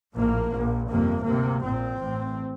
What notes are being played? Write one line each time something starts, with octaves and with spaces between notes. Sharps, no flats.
A#1 A2 A#3
A#1 A#2
G1 F2 C3 A#3
D2 C3 A#3
A#1 A#2 C4
A1 A2